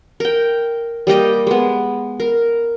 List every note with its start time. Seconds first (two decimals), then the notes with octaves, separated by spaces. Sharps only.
0.20 A#4 G5
1.07 G3 A#3 G4 D#5
1.47 G#3 B3
2.20 A#4